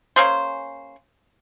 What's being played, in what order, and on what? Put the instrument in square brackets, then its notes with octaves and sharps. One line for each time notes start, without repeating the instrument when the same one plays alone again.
[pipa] A#3 C#4 G#4 C5